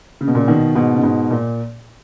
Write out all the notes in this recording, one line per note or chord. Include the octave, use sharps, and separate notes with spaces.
C#3
B2
A#2 C#3
B2 D#3
G#2 B2
C#3
G#2 B2
A#2